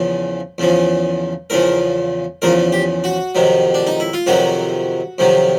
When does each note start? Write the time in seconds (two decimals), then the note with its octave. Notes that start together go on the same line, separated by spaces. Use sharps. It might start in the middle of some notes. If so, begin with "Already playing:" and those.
Already playing: E2 C#3 F3
0.58 E2 C#3 F3
1.50 E2 C#3 F3 A#4
2.42 E2 C#3 F3 A#4
2.72 G4
3.04 F#4
3.35 F2 C3 D#3 F#3
3.74 D4
3.87 D#4
4.00 E4
4.13 F4
4.27 F2 C3 D#3 F#3 F#4
5.18 F2 C3 D#3 F#3